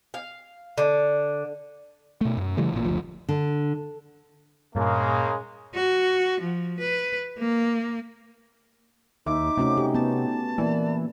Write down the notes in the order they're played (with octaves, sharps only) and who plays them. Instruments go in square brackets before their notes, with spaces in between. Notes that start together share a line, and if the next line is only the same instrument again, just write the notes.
[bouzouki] F5
D3
[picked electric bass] B2 A3
F#2
C#3 E3 G3 A3
A1 A#2
F#1 D2 F3
[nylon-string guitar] D3
[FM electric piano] G2 A#2 [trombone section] C#3 G#3 A#3
[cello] F#4
F3
B4
A#3
[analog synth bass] D#2 [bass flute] D#4 [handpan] E5 [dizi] D6
[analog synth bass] C3 [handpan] A3 C#4 F#4
[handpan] G4
[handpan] B3 [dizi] A5
[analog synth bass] E3 [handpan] A#3 [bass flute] D5